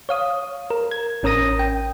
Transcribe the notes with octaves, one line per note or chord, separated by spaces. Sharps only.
C#5 F5 D#6
A#4
G#6
A1 C#4 A#4 D#6 A#6 D#7
G5